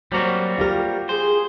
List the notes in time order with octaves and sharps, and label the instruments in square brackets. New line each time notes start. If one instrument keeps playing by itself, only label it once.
[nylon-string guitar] F#3 C4 [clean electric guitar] G3 A#3 F#4
[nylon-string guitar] F4 G4 A#4
[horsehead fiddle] G#4 [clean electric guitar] C5